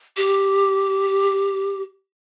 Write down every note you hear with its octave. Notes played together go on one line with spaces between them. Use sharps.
G4